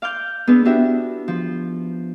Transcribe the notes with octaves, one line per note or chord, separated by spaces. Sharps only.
F5 D6 F6 G6
B3 D4 G#4 B4 E6
B3 D4 E4 F#4 G4 E5
F3